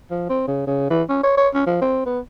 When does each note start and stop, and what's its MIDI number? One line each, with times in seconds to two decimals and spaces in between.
0.11 0.25 53
0.29 0.43 60
0.48 0.63 49
0.67 0.87 49
0.90 1.02 52
1.09 1.21 61
1.24 1.35 73
1.37 1.49 73
1.54 1.66 61
1.66 1.81 53
1.81 2.03 60
2.06 2.20 59